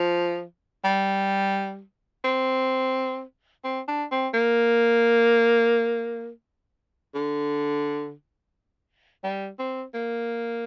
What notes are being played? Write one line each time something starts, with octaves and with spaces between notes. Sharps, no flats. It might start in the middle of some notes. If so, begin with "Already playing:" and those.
Already playing: F3
G3
C4
C4
D4
C4
A#3
D3
G3
C4
A#3